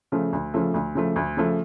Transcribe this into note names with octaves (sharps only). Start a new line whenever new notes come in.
C#3 F3 A3
D2
C#3 F3 A3
D2
C#3 F3 A3
D2
C#3 F3 A3